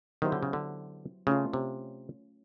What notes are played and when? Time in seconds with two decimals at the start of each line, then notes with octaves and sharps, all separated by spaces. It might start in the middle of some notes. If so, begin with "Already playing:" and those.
0.22 D#3 F#3 B3 E4 G4 C5
0.32 D3
0.43 C#3
0.53 D3
1.27 C#3 A3 C#4 F4
1.53 C3